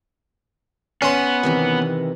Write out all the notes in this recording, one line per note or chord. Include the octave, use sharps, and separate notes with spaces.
B3 C#4 C6
C3 D#3 E3